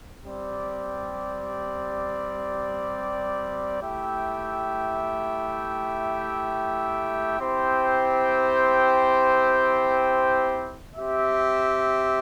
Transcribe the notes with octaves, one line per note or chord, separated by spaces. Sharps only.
G3 C4 G4 D5
A3 E4 G4 E5 G5
C4 E4 G4 C5 G5
C4 G4 E5